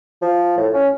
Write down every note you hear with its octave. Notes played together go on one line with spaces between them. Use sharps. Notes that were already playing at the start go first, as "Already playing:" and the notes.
F3
A2
C#4